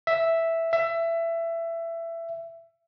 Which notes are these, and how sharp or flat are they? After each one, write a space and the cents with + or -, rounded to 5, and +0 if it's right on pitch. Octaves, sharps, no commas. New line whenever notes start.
E5 +0
E5 +20